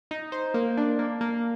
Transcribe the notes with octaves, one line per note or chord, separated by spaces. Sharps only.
D#4
C5
A#3
D4
A#3
A#3